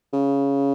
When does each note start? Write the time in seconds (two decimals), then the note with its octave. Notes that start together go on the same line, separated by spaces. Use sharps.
0.13 C#3